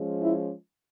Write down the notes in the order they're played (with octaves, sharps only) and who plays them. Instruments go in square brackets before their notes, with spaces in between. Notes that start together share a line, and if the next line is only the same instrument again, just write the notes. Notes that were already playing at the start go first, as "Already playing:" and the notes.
Already playing: [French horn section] F3 G#3 C#4
E4